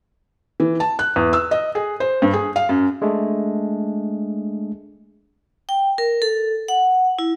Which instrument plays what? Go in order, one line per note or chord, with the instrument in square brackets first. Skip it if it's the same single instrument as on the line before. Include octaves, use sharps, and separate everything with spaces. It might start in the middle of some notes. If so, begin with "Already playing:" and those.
[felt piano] E3
A5
F#6
E2
E6
D#5
G#4
C5
G2
G#4
F5
F#2
[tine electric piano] G#3 A3 D4 G#4
[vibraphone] G5
A#4
A4
F#5
E4